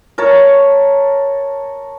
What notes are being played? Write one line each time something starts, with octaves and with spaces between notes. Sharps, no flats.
A#4 C#5 A5 C#6